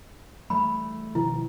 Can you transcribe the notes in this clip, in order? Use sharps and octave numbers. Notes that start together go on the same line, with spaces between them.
E3 G3 A3 B5
B2 D#3 F3 E4